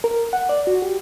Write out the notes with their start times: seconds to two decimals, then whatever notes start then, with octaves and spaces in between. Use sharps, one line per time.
0.04 A#4
0.33 F#5
0.49 D5
0.67 F#4
0.82 G4